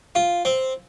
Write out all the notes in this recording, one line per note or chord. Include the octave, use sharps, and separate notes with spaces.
F4
C4